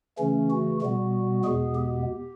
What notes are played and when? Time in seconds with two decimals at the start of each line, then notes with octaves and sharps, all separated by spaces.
0.18 C#3 E3 A3 C#4
0.50 F#4
0.81 B2 G3 B3 F#4
1.44 E2 B2 G#3 B3 G#4
1.75 G4